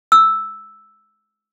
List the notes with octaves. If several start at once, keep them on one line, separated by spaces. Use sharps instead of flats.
E6